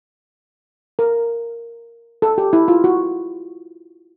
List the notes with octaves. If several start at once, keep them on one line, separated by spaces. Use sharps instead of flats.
A#4
A4
G4
E4
F4
F#4